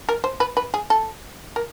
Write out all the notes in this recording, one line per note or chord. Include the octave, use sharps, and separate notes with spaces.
A#4
C5
B4
B4
G#4
A4
A#4